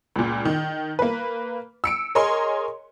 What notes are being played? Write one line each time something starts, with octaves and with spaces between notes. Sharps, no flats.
C#2 A#2
D#3
A#3 B4
E6 C#7 D7
G#4 A#4 C#5 D#5 G#5 C6